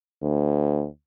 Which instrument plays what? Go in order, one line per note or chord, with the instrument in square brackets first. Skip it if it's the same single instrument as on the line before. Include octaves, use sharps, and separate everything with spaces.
[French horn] D2